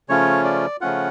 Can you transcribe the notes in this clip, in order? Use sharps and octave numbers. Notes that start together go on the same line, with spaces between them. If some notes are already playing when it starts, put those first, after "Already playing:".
C#3 F3 A3 C#4 F4 C#5
D5
C#3 F3 A3 C#4 F4 F#5